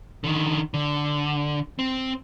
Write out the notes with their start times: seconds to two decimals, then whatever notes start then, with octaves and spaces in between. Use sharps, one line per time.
0.24 D3 D#3
0.74 D3
1.79 C4